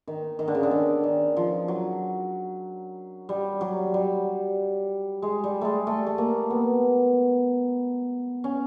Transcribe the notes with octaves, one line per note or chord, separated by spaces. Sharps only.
D#3
D#3
D3
C#3
D3
D#3
D#3
F3
F#3
G3
F#3
G3
G#3
G3
G#3 A3
A3
A3
A#3
B3
C#4